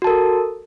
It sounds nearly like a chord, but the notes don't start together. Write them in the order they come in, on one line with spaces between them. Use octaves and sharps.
F#4 A5 A#4 A4